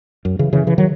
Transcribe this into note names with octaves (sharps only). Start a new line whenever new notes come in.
F#2
C#3 E3
C#3 E3
C#3 E3
D#3 F#3